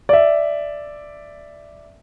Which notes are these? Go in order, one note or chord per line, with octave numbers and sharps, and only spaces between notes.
D5 E5